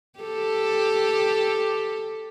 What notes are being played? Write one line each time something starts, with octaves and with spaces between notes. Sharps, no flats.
G4 A4